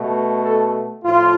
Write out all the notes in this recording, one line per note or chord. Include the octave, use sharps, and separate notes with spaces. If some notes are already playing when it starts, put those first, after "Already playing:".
Already playing: B2 A3
A4
A2 F3 F4